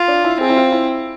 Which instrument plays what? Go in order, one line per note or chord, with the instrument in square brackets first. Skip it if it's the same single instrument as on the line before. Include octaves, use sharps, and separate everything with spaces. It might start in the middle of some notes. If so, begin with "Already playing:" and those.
Already playing: [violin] F4
[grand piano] D4
E4
[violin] C4 [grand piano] G#4
[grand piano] E4
F4
E4